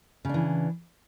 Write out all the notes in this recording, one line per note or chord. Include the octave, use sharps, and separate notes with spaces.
C#3 E3 D4